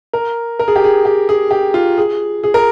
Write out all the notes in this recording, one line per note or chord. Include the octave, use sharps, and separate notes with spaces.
A#4
A#4
G#4
G4
G#4
G4
G#4
G4
F4
G#4
G#4
A#4